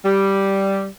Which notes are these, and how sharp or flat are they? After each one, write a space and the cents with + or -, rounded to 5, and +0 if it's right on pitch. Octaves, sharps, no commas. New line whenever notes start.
G3 -5